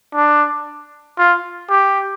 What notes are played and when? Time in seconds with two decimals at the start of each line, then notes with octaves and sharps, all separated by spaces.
0.15 D4
1.18 F4
1.70 G4